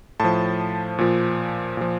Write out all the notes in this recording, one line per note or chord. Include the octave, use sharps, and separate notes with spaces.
A2 F3 A5
A#2 F3
A#2 F3